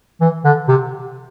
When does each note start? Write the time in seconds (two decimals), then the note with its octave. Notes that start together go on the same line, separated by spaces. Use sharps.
0.21 E3
0.44 D3
0.68 C3